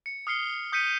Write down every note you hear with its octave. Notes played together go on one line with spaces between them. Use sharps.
C#7
D#6 F6 C7 C#7 G7
D#6 G6 B6 C#7 D#7